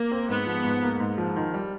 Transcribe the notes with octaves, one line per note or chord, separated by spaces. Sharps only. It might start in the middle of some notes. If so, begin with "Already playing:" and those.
Already playing: A#3
C4
G#2 B3
F3
G#2
A#3
G#2
F3
D#3
G3